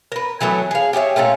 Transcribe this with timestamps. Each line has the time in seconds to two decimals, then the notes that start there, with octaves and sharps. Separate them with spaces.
0.12 A#4 B4
0.41 E3 F#3 A3 B3
0.71 G#4 F5
0.93 G4 G#4 C#5 E5
1.16 A#2 A3 C#4 F4